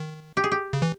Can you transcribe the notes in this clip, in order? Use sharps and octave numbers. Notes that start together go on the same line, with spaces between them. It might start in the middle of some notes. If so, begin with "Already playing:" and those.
Already playing: D#3
G4
G#4
G4
C#3
E3